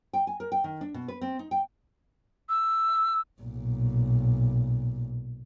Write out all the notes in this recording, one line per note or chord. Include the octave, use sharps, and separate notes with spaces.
G5
G#5
A#4
G5
D#3
D4
B2
B4
C4
D#4
G5
E6
B1 A#2